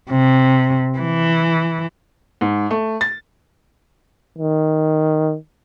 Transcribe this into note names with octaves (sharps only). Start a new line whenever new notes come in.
C3
E3
G#2
A3
A6
D#3